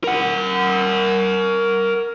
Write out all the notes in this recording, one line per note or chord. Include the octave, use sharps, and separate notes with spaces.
A#4 F#5